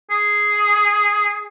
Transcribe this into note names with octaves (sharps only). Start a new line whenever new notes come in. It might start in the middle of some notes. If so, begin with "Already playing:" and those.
G#4